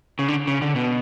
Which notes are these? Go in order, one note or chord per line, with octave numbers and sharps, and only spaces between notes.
C#3
D3
C#3
D3
B2